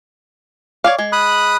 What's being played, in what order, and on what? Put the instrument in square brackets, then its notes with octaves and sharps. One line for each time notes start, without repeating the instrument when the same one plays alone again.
[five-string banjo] C#5 D5 F5
G#3
[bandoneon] B5 D#6 F#6